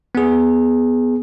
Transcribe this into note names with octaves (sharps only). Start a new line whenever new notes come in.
B3 G#4